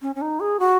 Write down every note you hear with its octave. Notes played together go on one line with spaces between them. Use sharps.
C#4
C#4
D#4
G#4
F#4